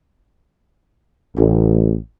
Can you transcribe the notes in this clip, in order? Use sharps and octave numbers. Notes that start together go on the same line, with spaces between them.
A1